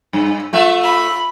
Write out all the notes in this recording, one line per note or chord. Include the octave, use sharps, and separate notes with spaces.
G2
A3 F4 E5
B5